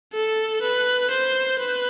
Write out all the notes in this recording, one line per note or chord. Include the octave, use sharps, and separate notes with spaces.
A4
B4
C5
B4